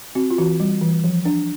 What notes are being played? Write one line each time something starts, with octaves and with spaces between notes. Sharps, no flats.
C4 F#4
F4
E3 F#4
G3
E3
F3
D4